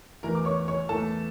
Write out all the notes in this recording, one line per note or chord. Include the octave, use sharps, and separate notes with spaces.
E2 E3 A3 A#4 A#5
D6
C#5 C#6
C#5 C#6
E2 E3 A3 A4 A5